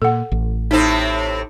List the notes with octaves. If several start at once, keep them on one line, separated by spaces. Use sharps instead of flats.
A#2 A4 F#5
A1
A2 C3 C4 D#4